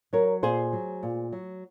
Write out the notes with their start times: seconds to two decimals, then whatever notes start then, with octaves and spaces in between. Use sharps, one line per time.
0.13 F#3 A#4 C#5
0.43 A#2 G#4 C5
0.73 F#3
1.03 A#2
1.33 F#3